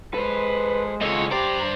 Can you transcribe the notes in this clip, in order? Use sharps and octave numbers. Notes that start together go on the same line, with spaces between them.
G#3 A4 B4 C5
C#3 C4 F4 A4 C#5 D#5
G2 G4 C5 D5 A#5